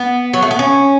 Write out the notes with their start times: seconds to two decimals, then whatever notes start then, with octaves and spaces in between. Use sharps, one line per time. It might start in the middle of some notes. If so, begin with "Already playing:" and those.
Already playing: B3
0.34 F#3
0.42 A3
0.51 B3
0.59 C#4